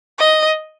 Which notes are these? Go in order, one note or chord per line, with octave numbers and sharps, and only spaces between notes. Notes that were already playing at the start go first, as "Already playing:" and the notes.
D#5